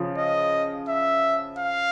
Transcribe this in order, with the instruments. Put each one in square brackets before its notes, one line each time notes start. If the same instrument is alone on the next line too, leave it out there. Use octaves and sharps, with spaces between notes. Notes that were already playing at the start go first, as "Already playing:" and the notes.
Already playing: [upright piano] C#3 F3
[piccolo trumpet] D#5
E5
F5